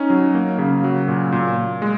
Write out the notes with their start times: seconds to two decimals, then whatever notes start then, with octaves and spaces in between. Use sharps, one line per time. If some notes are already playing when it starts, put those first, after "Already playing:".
Already playing: C#4 D#4
0.10 F#3
0.34 A#3
0.58 C#3
0.84 F#3
1.08 A#2
1.32 A#2
1.57 A#2
1.82 G#3